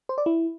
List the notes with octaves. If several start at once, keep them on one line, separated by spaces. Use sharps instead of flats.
C5
D5
E4